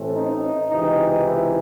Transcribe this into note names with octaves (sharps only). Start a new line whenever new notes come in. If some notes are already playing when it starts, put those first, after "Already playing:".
Already playing: A1 A2 E3 A3 C4
D#4
C#2 C3 E3 D#4
E4